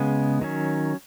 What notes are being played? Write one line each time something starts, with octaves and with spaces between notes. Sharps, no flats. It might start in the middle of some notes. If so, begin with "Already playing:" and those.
Already playing: C#3 G#3 B3
D#3 F#3 C#4